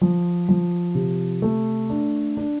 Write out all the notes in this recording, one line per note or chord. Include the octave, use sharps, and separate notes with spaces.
F3
F3
C3
A3
D4
D4